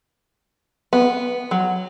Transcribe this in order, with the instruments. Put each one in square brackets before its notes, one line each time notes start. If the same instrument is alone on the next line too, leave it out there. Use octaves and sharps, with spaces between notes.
[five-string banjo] B3
F#3